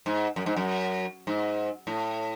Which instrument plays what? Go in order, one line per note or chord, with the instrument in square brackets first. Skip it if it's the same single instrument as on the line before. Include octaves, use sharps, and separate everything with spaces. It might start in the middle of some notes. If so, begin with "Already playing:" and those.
[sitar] G#2
F#2
G#2
F#2
G#2
A2